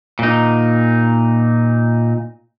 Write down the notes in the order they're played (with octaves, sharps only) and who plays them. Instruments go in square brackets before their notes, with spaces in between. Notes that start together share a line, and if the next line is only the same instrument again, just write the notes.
[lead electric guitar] A#2 D#4